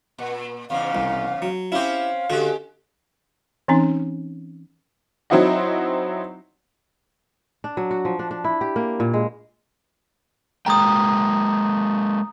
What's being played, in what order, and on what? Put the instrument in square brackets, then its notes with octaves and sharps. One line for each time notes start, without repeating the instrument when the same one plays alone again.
[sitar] A#2
[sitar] E2 G#2 C#3 [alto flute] F5
[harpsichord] C2
F#3
[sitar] C4 C#4 [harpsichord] E4 G4 [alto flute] F5
[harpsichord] D3 F#4 [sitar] G#3 G4
[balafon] E3 C4 C#4 D#4
[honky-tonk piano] F#3 C4 D#4 E4 F#4 D#5
[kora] D4
F#3
F#4
F3
D4
D4
E4
G4
A#3
A#2
G#3
[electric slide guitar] G#3 A#3 G5 [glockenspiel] A#5 D#6